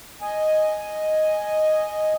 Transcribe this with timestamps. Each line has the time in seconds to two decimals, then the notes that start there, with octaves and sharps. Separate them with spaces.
0.21 D#5 G#5